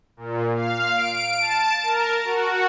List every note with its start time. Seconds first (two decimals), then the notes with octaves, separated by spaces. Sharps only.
0.17 A#2
0.56 F5
0.94 D7
1.38 A5
1.83 A#4
2.25 F#4